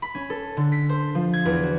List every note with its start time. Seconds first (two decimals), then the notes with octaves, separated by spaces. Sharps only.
0.02 B5
0.15 C#4
0.30 A4
0.57 D3
0.72 B6
0.89 C5
1.15 F3
1.33 G#6
1.45 E2
1.63 F#4